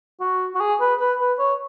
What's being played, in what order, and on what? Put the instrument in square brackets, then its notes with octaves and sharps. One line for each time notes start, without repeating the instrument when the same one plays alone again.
[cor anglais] F#4
F#4
G#4
B4
B4
B4
C#5